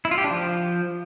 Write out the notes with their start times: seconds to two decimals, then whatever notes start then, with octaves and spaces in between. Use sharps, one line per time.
0.05 E4
0.11 F4
0.18 G4
0.24 D4
0.31 F3